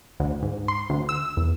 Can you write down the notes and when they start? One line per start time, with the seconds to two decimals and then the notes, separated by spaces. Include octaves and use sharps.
0.20 D2
0.43 G#2
0.68 C6
0.90 D2
1.09 E6
1.37 E2